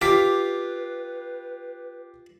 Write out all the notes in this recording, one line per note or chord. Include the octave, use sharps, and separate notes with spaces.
F4 G4 B4 D6 B6